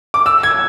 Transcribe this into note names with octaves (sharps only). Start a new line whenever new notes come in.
D6
E6
G#6